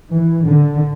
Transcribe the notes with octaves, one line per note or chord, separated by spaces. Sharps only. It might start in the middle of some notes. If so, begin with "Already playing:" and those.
E3
D3